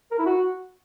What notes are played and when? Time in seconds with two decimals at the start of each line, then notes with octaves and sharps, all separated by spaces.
0.12 A#4
0.19 E4
0.26 F#4